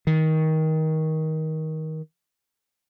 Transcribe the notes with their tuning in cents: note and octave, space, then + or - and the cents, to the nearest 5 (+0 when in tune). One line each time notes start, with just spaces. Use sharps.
D#3 +20